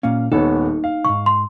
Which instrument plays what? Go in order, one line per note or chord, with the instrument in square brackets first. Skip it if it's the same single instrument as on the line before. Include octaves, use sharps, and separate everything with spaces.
[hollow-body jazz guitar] A#2 A#3 C#4 [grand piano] F5
[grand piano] D#1 B3 C#5 [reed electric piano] D#4 [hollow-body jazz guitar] A4
[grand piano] F5
[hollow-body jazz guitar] B1 G#2 [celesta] C#6
[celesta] C6